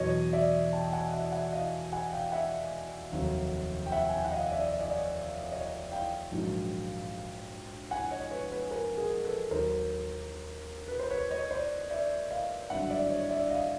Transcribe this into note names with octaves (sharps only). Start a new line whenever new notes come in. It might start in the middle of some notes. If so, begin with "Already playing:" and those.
Already playing: E2 B2 F#3 C#5 D#5
D5 E5
G5 A5
F#5 G#5
E5 F#5
E5 F#5
D#5 F5
F#5 G#5
F5 G5
E5 F#5
F1 D#2 D#3 F#3
G5
E5 F#5
G#5
G5
F#5
D#5 F5
D5 E5
D#5
D5
C#5 D#5
C#5 D#5
F5 G5
A#1 G#2 D#3 F#3
F#5 G#5
C#5 D#5
B4 C#5
B4 C#5
A#4 C5
G#4 A#4
A4 B4
D#2 D#3 F#3 A#4 C5
B4
C5
B4 C#5
C#5 D#5
C5 D5
D5 E5
D#5 F5
G#1 G2 D3 F#3 E5 F#5
D5 E5
C#5 D#5
D5 E5
D#5 F5